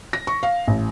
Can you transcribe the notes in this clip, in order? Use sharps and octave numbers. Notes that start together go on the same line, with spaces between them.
A#6
C#6
F5
A1